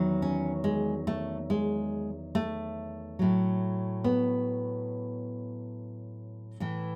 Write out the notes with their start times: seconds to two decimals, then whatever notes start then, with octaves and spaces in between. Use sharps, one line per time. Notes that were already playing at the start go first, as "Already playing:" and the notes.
Already playing: E2 D#3 F#3
0.22 C#4
0.64 G#3
1.07 A3
1.50 G#3
2.35 A3
3.19 A2 F#3
4.04 B3
6.60 A2 E3